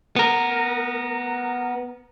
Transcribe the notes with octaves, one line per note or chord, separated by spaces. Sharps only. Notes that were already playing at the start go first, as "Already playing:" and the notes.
B3 A#4